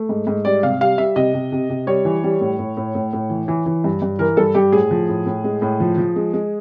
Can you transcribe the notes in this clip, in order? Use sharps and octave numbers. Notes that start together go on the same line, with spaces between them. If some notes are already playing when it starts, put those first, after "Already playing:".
Already playing: A3
G#2
G#2
G3 D5
C3 F5
G3 F5
G3 E5
C3 D#5
C3
C3
C3
G3 C#5
E3
G3
A2
A2
A2
A2
A2
E3
E3
E3
G2
G2
E3 A#4
G2 A4
G2 G4
A2 G#4
F3
A2
A2
G#3
A2
F3
F3
G#3
G#3